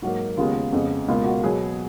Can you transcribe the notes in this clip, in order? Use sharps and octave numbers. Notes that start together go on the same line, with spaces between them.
G#2 F#3 A#3 F#4
D#2 C#3 G#3 B3 F4
F2 C#3 G#3 B3
C#2 B2 A#3 F4
F#4
B2 F#3 B3 G#4